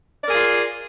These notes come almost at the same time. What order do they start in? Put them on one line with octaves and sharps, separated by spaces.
D5 A#4 G#4 F4